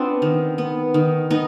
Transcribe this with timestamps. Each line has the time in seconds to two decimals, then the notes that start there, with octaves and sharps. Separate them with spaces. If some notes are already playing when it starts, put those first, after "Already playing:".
Already playing: B3 C4 D4 F4
0.22 D#3
0.58 B3
0.94 D#3
1.30 B3 D#4